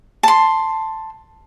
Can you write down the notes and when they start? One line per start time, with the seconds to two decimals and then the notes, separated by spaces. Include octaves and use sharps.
0.23 A5 C6